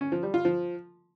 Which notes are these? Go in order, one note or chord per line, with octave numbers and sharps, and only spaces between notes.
C#4
F3
G3
F4
F3